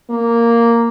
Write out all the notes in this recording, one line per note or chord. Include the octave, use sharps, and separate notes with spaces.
A#3